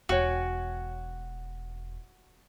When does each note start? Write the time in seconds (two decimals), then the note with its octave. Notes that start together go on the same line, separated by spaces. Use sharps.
0.09 E1 F#4 C#5 G5 G#5